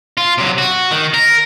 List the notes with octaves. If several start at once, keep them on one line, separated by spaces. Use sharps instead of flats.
F4
C3 F#3
F#4
D#3
A#4